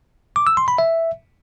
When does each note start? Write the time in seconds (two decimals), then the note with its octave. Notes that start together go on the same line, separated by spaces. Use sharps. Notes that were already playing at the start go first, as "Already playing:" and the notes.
0.36 D6
0.47 E6
0.57 C6
0.68 B5
0.78 E5